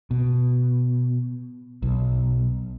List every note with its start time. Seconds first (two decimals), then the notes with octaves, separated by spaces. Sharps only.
0.11 B2
1.82 B1